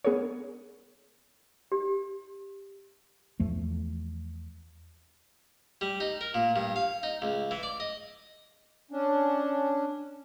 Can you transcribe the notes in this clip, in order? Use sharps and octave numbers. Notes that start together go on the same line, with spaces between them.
B3 G#4 A#4 C#5
G4
E2 F3 A3
G3
D#4
A#4
A#2
G2
F5
D#4
C#2
E3
D5
D#5
C#4 D4